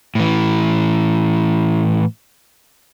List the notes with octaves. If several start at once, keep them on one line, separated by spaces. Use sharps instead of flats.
A2 E3